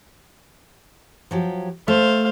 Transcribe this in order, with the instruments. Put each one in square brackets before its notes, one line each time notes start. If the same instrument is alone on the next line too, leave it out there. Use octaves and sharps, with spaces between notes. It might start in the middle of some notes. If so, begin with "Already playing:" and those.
[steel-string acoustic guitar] F3 F#3 G4
[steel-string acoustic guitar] A3 [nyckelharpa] C5 F5